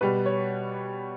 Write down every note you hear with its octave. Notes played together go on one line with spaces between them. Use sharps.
B2 G3 B4
C#5